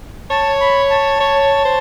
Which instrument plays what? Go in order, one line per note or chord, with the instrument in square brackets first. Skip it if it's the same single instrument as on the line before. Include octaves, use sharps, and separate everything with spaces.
[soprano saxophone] C#5 [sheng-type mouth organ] A5
[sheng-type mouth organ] B5
A5
[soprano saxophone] C#5
C5